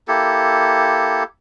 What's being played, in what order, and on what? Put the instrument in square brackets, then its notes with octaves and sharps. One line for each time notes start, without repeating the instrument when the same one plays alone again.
[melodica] A#3 E4 G4 A4